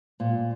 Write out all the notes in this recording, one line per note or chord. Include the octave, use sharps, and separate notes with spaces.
A#2